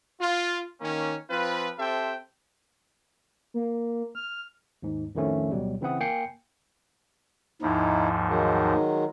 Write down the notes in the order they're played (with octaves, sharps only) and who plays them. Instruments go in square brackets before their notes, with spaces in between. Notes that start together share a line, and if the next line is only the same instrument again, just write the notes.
[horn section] F4
D#3 A#3 C#4
F3 C4 F4 B4
C4 G4 A4 C5 E5 G5
[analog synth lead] A#3
F6
[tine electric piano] D#2 G#2
F2 A2 D#3 F3 A3 C#4
D2 B2 F#3 G3
C#3 E3 C4 E4 F#5 D#6
A#3 G5 G#5 C7 C#7
[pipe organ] D#2 G#2 F3 [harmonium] D#4 E4
[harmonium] D#3 F#3 G#3